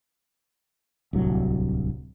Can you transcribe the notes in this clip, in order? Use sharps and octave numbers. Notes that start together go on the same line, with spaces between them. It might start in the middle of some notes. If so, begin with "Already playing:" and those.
D1 C2 F#3